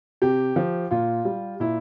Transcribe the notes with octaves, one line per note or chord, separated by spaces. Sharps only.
C3 G4
F3
A#2 F4
G3
A#2 E4